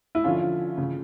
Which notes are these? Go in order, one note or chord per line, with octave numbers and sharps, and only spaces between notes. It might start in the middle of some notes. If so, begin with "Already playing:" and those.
E4
D3 F3 C#4 F4
C#3